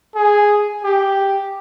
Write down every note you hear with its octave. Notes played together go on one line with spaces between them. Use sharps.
G#4
G4